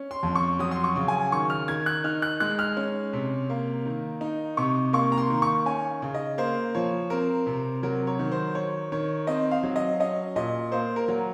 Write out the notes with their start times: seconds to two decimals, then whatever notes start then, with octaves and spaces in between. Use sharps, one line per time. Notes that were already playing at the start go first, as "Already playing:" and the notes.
Already playing: C#4
0.11 C6
0.23 F2
0.35 C#6
0.59 F#3 D#6
0.71 C6
0.84 C#6
0.96 C#3
1.08 G#5
1.32 D#3 C#6
1.50 F6
1.68 D#3 G#6
1.86 F#6
2.04 D#4 F6
2.22 F#6
2.40 G#3 F#6
2.59 F6
2.77 C#4
3.13 C3
3.50 A#3
3.86 D#3
4.21 D#4
4.57 C3 C#6
4.93 A#3 C#6
5.12 A#5
5.18 C6
5.30 D#3
5.42 C#6
5.66 C#4 G#5
6.02 C#3
6.14 D#5
6.38 A#3 C5
6.75 F3 C#5
7.10 C4 A#4
7.46 C3
7.83 F#3 A#4
8.07 C#5
8.19 D#3
8.32 C5
8.55 D#3 C#5
8.92 D#3 C#5
9.27 C4 D#5
9.51 F5
9.63 F#3
9.76 D#5
10.00 C#4 D#5
10.36 A#2 D#5
10.72 A#3 C5
10.96 A#4
11.08 F#3